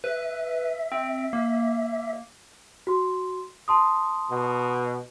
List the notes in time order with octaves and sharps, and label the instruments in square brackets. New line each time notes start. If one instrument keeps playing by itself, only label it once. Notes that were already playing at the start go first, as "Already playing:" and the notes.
[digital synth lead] B4 [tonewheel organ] E5
[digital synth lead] C4
A#3
[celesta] F#4 C6
A5 C6 D#6
[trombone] B2